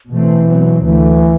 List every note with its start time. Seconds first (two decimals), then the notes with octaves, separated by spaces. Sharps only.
0.12 B2 E3 A3 C4
0.47 B2 F#3 C4
0.84 D2 D3 E3 F#3 A3